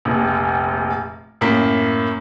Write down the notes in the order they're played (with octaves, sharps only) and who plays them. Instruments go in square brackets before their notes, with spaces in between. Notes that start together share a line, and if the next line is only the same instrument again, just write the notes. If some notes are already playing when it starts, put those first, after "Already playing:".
[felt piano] F1 A#1
F#2 A2 A#3 B6